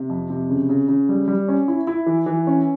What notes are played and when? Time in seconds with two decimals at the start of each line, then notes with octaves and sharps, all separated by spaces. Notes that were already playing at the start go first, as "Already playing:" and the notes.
Already playing: C3
0.09 F2
0.30 C3
0.50 C#3
0.69 C#3
0.88 C#3
1.09 G3
1.28 G3
1.48 C#4
1.68 E4
1.87 E4
2.06 E3
2.26 E3
2.47 C#4